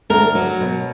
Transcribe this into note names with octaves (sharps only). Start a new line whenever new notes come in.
D2 A#4
F#3
B2